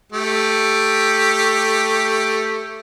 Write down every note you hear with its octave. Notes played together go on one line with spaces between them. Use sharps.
A3 G4